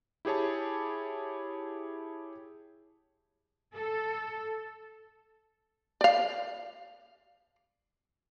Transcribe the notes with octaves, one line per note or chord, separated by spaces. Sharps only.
E4 G4 G#4 C#5 A5
A4
D5 F5